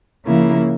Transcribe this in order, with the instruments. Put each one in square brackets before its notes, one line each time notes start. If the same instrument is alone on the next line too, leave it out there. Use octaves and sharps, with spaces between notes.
[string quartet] C#3 F3 A#3 E4